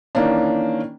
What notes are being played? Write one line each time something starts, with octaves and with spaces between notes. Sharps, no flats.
D#3 E3 A#3 C#4 D4